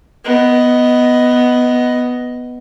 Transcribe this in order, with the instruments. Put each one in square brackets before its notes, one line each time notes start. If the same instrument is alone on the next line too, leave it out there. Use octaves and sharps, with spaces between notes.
[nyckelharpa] B3 D#5